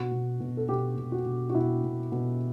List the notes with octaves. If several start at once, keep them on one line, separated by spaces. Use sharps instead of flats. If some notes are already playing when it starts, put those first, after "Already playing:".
Already playing: B2 F#4
B2
B2
A4
B2 G4
B2
F#4
B2
F#4
B2 E4
B2
B2